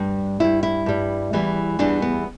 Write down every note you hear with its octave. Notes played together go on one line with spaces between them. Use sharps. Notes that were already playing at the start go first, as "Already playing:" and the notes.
Already playing: G2 G3 D4
G2 G3 E4
E4
G2 G3
E2 E3 G3
E2 E3 G3 D4
B3